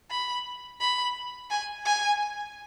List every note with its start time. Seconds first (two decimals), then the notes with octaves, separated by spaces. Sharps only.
0.11 B5
0.81 B5
1.50 G#5
1.85 G#5